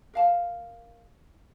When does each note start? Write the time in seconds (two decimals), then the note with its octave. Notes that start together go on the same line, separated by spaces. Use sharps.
0.14 A#4 F5 A5